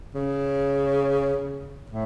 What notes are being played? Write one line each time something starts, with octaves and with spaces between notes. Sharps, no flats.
C#3
A2